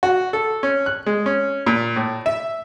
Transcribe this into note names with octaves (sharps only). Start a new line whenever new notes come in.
F#4
A4
C#4
F#6
G#3
C#4
A#2
A2
E5